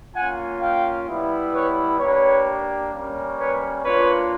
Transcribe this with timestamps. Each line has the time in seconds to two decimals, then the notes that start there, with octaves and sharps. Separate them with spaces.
0.15 A#3 C#4 F4 F#5 G#5
0.61 F5 G5
1.08 G3 B3 E4
1.54 B4 C#5
1.99 A#3 D4 G4 B4 C#5
2.92 G3 A#3 C#4
3.38 B4 C#5
3.84 A#3 D4 F4 B4 C#5